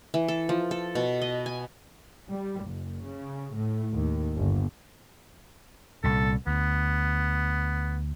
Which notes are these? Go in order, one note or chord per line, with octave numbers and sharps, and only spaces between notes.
E3
A4
F3
A4
B2
D#5
G#5
G3
F#1
C#3
A2
D#2
G1
C2 A#2 A4
D2 B3